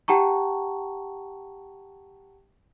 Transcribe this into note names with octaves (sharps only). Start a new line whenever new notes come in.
G4 F#5 G5 A5 A#5 C#6